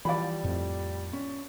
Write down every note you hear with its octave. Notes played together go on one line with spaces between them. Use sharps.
E3 F3 G3 D5 B5
F2 A2
C#4